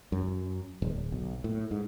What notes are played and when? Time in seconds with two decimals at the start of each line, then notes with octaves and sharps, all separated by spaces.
0.12 F#2
0.82 D1
1.12 B1
1.44 A2
1.71 G#2